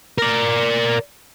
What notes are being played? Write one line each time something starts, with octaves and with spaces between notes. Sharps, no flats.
A#4 D5